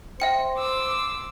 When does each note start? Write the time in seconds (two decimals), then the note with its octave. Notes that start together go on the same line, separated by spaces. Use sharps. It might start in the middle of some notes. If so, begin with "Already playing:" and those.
0.20 C5 E5 G5 C#7
0.57 C6 D6 E6